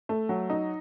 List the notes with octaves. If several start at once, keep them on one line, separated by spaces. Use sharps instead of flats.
A3
F#3
D#4